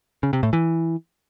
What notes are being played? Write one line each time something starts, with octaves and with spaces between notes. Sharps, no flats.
C#3
C3
A2
E3